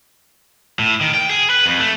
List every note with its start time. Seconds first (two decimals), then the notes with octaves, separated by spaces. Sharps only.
0.79 A2
1.01 D#3
1.14 G5
1.29 G#4
1.50 B4
1.66 F2
1.80 A3